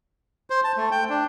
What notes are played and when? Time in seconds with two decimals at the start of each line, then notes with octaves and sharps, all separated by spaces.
0.50 C5
0.64 A5
0.77 A3
0.91 G5
1.10 D4